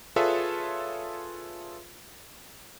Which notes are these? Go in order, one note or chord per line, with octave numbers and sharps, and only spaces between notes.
F4 G#4 A4 B4 C#5 E5